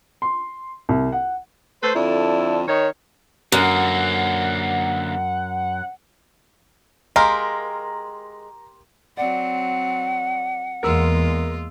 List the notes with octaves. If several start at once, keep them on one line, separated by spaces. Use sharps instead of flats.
C6
C2
F#5
A3 B4 C5
F2 D3 E4 A4 D5
D#3 C#5
F#2 D3 A#3 F#5
G#3 G4 A#4 F5 A#5 C6
F#3 C4 D5 F#5
E2 G#3 A#3 F4 A#4 E6